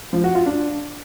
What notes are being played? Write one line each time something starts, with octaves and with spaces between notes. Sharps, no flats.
F3
F#4
F4
D4